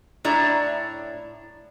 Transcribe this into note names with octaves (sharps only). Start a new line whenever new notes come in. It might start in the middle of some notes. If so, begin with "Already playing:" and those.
A2 D4 E4 D5 A#5